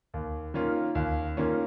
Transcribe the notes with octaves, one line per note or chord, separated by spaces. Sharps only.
D#2
D#3 A#3 C#4 F4
D#2
D#3 A#3 C#4 F4